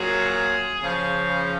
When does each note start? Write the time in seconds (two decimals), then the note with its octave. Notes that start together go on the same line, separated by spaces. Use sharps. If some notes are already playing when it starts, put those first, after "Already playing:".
Already playing: A#2 F#3 G#4
0.83 C#3 F3